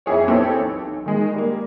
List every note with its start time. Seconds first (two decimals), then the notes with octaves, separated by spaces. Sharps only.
0.06 F2 E4 G#4 C#5
0.27 E3 C4 G4 A4 C#5
0.62 B1
1.06 D#3 G#3 D#4
1.34 G3 A#3